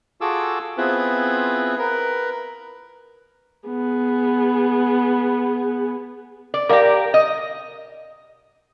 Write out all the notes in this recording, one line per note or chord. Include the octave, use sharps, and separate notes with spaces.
F4 F#4 G#4 A4 D6 E6
B3 C4 E4 F4 G#4 B4
A#4 B4
B3 G#4
D5
G4 A#4 D5 F5 D6
D#5